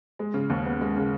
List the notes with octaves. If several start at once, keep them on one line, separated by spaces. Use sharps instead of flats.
G#3
C#3
D#2
B3
G#3
C#3